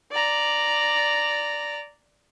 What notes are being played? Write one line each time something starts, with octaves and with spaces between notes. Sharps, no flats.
D5 A#5